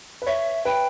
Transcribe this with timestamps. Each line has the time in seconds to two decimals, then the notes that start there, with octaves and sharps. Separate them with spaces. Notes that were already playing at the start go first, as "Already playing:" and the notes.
0.22 B4
0.27 C#5 E5
0.65 B4 G5